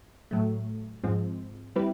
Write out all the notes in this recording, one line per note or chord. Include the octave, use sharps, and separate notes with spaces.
A2 F#3 A3
G#2 F3 G#3 C4
G3 C4 E4 G4 B4